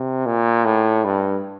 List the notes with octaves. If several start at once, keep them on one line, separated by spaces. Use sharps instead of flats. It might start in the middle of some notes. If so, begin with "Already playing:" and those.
Already playing: C3
A#2
A2
G2